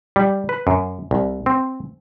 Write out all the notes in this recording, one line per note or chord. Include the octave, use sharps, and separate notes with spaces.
G3
B4
F#2
C2
C4